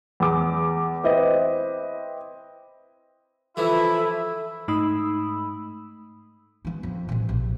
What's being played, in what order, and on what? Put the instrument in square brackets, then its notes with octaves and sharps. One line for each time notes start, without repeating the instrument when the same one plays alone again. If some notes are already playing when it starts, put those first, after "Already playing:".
[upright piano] E2 D6
C4 E4 B4 D#5
[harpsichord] E3 F3 [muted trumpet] E4 [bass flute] A4 [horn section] E5
[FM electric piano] G#2 A3 D#4 B5 D#6 E6
[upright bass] E3 B3
F2
A1 B2
A#1